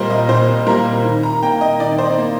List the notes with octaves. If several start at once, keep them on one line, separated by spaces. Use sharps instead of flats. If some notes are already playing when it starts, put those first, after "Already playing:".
Already playing: A#2 G3 A#3 A#4 C5 D#5
D#5
A#2 C5
G3 A#3 A#4
D#3
A#5
A#3 G5
D#5
D#3 D5
C5
D5
A#3